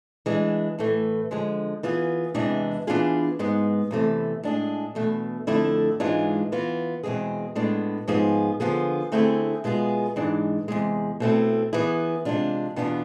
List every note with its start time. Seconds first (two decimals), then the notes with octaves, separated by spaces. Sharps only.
0.26 E3 G#3 D4
0.78 A2 E3 A3
1.31 D3 F3 G#3
1.83 E3 B3 F4 G#4
2.34 E2 C3 E3 G#3 D4
2.87 E3 B3 D4 F4 G#4
3.39 G#2 G#3 B3
3.91 E2 C3 E3 A3
4.43 A2 G#3 D4 G#4
4.95 E2 B2 A3
5.47 F2 D3 A3 E4
6.00 G#2 E3 G#3 D4 F4
6.52 E3 B3 F4
7.03 E2 B2 G#3 C4 G#4
7.55 A2 G#3 B3 D4
8.08 G#2 F3 B3 F4 G#4
8.60 D3 F3 B3 F4 G#4
9.12 D3 A3 C4 E4 G#4
9.64 B2 G#3 B3 F4 G#4
10.16 G#2 E3 G#3 D4
10.68 E2 C3 G#3
11.20 B2 A3 C4 E4
11.73 E3 B3 E4 G#4
12.25 C3 G#3 D4 F4
12.76 E2 B2 B3 D4 F4